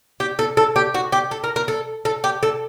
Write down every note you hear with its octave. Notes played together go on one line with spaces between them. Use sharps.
G4
A4
A4
G4
F#4
G4
A4
A#4
A#4
A4
A4
G4
A4